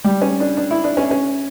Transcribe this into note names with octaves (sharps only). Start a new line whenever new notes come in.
G3
C#4
D4
D4
E4
D4
C#4
C#4